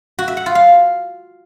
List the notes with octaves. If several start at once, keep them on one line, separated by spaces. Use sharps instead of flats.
F#4
E5
F#5
F4
F5